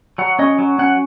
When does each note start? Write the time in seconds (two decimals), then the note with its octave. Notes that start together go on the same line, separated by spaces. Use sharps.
0.18 F#3 F#5
0.39 C#4 D#5
0.59 F#3
0.79 C#4 F#5